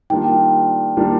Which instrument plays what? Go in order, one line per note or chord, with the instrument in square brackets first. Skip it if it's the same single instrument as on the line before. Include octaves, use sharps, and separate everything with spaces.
[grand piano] D#3 G3 A#3 D4 F4 [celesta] G5
[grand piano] D#3 G3 A#3 D4 F4